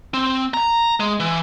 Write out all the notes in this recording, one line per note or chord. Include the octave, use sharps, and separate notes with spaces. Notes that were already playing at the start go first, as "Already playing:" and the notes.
C4
A#5
G#3
E3